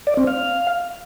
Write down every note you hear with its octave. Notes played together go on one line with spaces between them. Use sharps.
D5
C4
F5